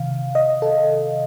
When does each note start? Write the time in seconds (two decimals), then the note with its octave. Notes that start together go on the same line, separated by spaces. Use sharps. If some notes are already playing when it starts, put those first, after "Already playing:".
Already playing: C3 D#3 F5
0.35 D#5
0.62 A4